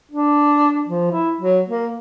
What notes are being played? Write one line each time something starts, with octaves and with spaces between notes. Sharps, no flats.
D4
F3
E4
F#3
A#3